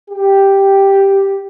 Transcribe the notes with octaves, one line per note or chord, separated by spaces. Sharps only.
G4